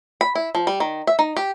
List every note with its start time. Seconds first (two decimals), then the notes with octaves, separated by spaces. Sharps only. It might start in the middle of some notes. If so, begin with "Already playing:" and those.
0.21 B5
0.35 E4
0.55 F3
0.67 G3
0.80 D#3
1.07 E5
1.19 D#4
1.37 G4